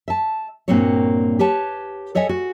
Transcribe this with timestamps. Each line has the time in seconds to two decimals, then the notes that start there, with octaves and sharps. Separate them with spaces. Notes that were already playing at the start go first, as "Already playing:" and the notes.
0.08 E5 A5
0.68 G2 A#2 A#3 C4 F#4 C#5
1.39 G4 B4 C#5 A5
2.15 A4 C#5 D#5 E5 G#5
2.29 F#4